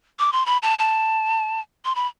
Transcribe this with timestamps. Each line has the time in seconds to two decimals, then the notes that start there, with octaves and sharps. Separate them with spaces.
0.19 D6
0.33 C6
0.46 B5
0.63 A5
0.79 A5
1.85 C6
1.95 B5